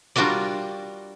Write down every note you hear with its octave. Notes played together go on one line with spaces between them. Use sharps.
G3 D4 F4 F#4 A#4 D5